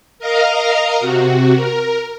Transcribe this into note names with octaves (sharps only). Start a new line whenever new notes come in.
A#4 D#5 F5 A#5
C3 F#4
A#4